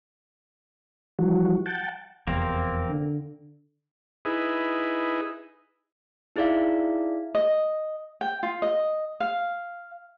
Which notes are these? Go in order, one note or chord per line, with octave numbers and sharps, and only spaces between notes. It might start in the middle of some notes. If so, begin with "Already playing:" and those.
E3 F3 G3 F#4
F#5 G5 A5
F1 E2 A#3 C4
D3
D#4 E4 G#4 B4
D#4 E4 G#4 D5 E5 F5
D#5
G5
F4
D#5
F5